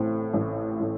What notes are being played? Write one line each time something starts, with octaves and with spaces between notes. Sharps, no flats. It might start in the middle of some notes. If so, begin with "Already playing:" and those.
Already playing: A1 A2 A3 C4
A1
A2 A3